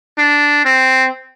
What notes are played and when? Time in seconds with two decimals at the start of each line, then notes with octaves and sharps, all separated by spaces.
0.18 D4
0.65 C4